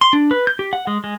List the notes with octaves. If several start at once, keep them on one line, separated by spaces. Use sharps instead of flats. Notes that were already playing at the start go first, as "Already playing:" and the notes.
C6
D4
B4
G6
G4
F#5
G#3
G#3